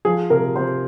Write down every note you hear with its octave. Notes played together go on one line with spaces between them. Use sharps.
F3 G#4
C3 A#4
C3 C5